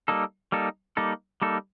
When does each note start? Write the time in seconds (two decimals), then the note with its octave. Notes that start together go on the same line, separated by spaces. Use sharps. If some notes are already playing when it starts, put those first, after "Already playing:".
0.08 G3 A#3 D#4 A4
0.52 G3 A#3 D#4 A4
0.97 G3 A#3 D#4 A4
1.42 G3 A#3 D#4 A4